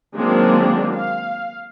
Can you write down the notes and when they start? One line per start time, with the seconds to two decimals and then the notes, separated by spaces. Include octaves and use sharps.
0.16 D#3 F#3 G#3 A#3 C4 D4
0.93 F5